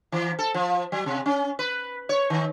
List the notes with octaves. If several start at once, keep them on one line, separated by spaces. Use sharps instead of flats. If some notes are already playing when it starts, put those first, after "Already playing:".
E3
A4
F3
F#3
C3
C#4
B4
C#5
D#3